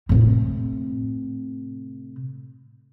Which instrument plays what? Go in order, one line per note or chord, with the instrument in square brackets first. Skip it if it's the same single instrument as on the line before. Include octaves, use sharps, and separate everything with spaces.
[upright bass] A2 C3